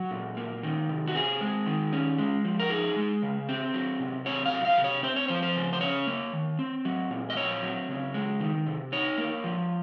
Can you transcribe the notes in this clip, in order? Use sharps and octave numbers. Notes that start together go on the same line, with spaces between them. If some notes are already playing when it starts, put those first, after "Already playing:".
Already playing: F#3 F#4
A#2
A#3
D#3
C3
F#4
C4 G#4
G#3
D#3
C#4
G#3
F3
A#4
D#4 G#4
G#3
C#3
C4
F#3
C3
C4 C#5
F5
F#3
F5
C3
C#5
C4 C5
C#5
F3 C5
C5
C#3
C5
C#4 C#5
A#3
D#3
C4
F#3
A#2
D#5
C4 C#5
F#3
C#3
G#3
D#3
C3
D#4 C#5
A#3
F3